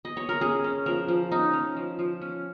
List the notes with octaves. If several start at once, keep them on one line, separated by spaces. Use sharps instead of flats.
D#5
C#5
A#4
C#4 G#4
C#4
F3 A#4
F3
C#4 D#4
C#4
F3
F3
C#4